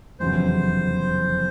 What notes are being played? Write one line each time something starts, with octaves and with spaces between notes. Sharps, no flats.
F1 E2 C#3 F#3 C5